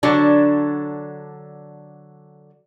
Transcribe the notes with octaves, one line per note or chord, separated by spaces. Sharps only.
D3 F#3 D4